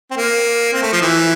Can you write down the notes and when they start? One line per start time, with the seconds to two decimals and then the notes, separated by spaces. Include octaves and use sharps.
0.11 C4
0.17 A#3
0.73 C4
0.83 A3
0.92 F3
1.02 E3